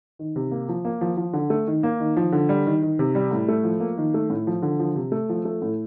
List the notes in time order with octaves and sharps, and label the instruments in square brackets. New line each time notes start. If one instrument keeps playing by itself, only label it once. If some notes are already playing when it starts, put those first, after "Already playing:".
[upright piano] D#3
C3
A#3
F3
A#3
F3
F3
D3
A3
D#3
A#3
D#3
F3
D3
G3
D#3
D#3
C3
G3
A2
A3
F3
A#3
D#3
A3
A2
F3
D3
F3
C3
A3
F3
A3
A2